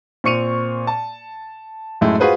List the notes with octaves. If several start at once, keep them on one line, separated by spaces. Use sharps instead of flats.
A#2 C4 C#6 C#7 D#7 F7
A5
F#2 A2 G#3 A3 E4
F4 F#4 G#4 B4 C5